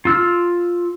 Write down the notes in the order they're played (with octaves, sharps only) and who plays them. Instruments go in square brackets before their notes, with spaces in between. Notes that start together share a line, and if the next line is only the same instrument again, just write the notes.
[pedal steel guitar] F4 E6 F6